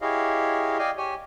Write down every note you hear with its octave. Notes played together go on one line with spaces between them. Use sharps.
E4 G4 G#4 C#5 D#5 F5
D5 D#5 F5 G5 G#5
G4 C#5 G#5